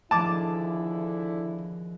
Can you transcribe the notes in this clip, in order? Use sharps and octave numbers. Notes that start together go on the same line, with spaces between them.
D#2 D3 F3 E4 G#4 A5 D6